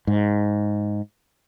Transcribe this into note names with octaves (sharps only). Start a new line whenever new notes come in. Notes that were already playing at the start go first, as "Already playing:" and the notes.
G#2